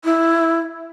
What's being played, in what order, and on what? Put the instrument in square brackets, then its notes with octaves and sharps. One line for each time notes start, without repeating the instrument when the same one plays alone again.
[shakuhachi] E4